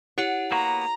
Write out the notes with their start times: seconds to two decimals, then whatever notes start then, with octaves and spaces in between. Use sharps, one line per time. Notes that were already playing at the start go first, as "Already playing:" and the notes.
0.18 E4 G4 C#5 F#5
0.52 A#3 B3 F#4 A#5